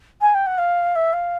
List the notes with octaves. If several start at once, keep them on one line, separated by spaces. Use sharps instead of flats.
G#5
G5
F#5
F5
E5
F5